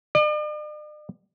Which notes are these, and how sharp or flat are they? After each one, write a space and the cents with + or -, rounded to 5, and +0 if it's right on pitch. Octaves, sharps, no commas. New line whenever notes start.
D5 +45